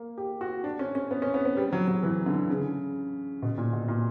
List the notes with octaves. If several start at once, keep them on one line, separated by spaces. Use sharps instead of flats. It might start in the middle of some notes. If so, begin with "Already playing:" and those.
Already playing: A#3
G4
F#4
D4
C#4
C#4
B3
C#4
B3
B3
G3
F#3
F#3
E3
D3
C#3
B2
A#2
B2
A#2